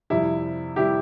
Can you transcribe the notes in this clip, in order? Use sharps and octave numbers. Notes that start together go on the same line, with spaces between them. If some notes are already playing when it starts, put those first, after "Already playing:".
F2 C3 G3 E4
C3 G3 E4 G4